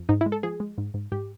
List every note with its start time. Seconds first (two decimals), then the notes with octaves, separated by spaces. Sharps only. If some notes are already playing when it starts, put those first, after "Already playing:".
Already playing: F2
0.09 G#2 D#4
0.21 E4
0.26 G#3
0.32 A4
0.43 F3 G#4
0.60 G#3
0.78 G#2
0.94 G#2
1.12 G#2 G4